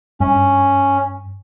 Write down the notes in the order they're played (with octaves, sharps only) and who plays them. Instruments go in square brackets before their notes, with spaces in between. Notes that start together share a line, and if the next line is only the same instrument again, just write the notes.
[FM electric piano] G2 [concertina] C#4